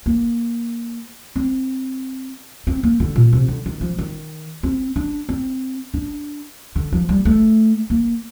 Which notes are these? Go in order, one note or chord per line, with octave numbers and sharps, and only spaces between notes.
A#3
C4
C4
A#3
D3
A#2
C3
D3
D#3
F3
D#3
C4
D4
C4
D4
D3
F3
G3
A3
A#3